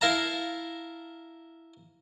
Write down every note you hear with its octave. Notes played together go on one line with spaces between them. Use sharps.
E4 A#4 F5 A5 A#5